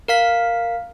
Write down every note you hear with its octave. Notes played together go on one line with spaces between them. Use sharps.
A#4 F5 B6